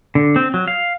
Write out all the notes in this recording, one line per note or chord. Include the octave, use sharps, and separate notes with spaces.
D3
C4
F#3
F5